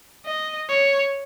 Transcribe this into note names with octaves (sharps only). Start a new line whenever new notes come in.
D#5
C#5